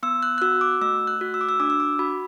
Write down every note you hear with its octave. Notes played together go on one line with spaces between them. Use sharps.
B3 E6
F#6
F#6
F#4 E6
D6
A3 E6
F#6
F#4
E6
D6
E6
D4 D6
E6
D6
F#4 B5